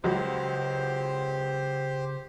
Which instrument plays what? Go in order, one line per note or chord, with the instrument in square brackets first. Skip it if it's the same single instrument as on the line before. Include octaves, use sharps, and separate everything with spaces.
[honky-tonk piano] C#2 F#3 [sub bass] C#3 [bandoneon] G4 C5